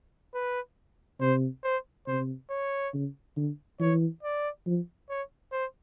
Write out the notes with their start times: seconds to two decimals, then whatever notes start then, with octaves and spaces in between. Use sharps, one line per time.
0.34 B4
1.20 C3 C5
1.64 C5
2.07 C3 C5
2.50 C#5
2.93 C#3
3.36 D3
3.80 E3 C#5
4.23 D5
4.66 F3
5.09 C#5
5.52 C5